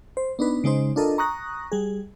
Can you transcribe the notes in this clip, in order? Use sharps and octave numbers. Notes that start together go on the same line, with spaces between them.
C5
B3 D4 D#4 B4
C#3 G#3 D#4 C5
D4 F4 A4 A#4 D#5
A#5 C#6 D#6 F#6 A#6
G3 G#4